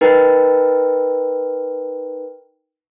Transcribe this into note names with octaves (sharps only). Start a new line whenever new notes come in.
D#4 A#4 B4 G5 A#5